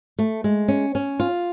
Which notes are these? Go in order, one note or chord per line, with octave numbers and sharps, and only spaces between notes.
A3
G#3
C#4
C#4
F4